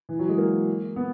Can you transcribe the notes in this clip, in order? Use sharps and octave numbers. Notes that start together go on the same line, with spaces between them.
E3
F#3
G#3
A#3
B3